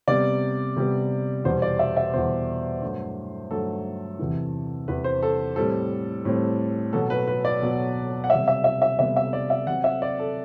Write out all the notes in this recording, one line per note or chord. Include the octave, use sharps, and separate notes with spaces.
C3 G3 B3 D5
C3 G3 B3
E2 B2 G3 B3 C5
D5
E5
E5
E2 B2 G3 B3 C5
G2 F#3 A3
G2 F#3 A3 A4
E2 C3 E3
E2 C3 E3 B4
C5
A4
A2 G3 C4 A4
A2 G3 C4
B2 F#3 B3 A4
B4
B4
D5
B2 F#3 B3
F#5
C3 G3 B3 E5
E5
E5
E5
C3 G3 B3 E5
E5
D5
E5
C3 F#3 C4 F#5
E5
D5
A4